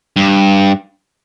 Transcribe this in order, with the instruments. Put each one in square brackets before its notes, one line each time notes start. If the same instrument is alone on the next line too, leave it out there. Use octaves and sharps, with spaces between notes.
[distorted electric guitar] G2